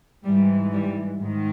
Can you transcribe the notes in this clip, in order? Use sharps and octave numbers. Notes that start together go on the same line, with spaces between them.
G#2 E3 G3
G3
G#2 D#3